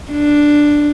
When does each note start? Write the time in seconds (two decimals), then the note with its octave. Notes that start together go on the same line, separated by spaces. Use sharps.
0.11 D4